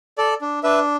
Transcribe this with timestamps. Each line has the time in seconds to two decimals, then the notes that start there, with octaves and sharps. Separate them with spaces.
0.18 A4 D5
0.41 D4
0.63 D4 B4 E5